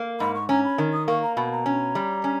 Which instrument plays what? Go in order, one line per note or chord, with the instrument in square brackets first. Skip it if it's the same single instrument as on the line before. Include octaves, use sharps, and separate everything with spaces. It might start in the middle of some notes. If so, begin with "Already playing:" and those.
Already playing: [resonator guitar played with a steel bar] A#3
[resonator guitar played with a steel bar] G#2 [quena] B5
[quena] C#6
[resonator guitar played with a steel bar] C#4 [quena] A#5
[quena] B5
[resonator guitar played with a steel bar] D#3
[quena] D#6
[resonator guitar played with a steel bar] A#3 [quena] C#6
[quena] A#5
[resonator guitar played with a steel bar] B2 [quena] B5
[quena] A#5
[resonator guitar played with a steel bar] C#4
G3
C#4